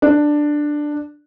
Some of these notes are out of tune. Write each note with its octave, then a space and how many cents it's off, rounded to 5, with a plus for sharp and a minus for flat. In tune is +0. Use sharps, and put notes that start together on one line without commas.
D4 +10